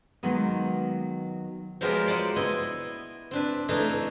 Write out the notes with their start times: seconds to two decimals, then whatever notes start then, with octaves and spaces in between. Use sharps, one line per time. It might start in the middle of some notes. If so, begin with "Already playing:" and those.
0.23 D#3 F#3 G#3 A#3 B3
1.81 F3 F#3 G#3 B3 G4 A#4
2.07 C5 D5 D#5 F#5
2.36 B3 E4 D#5 G5
3.31 C4 D4 B4
3.69 E3 A3 D4 D#4
3.88 A3